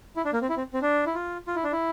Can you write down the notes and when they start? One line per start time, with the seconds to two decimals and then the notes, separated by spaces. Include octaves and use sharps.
0.16 E4
0.25 D4
0.33 A#3
0.41 C4
0.49 E4
0.57 C4
0.73 C4
0.82 D4
1.06 E4
1.15 F4
1.47 F4
1.56 E4
1.64 D4
1.72 E4